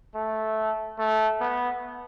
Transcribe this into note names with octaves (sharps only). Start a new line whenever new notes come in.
A3
A3
B3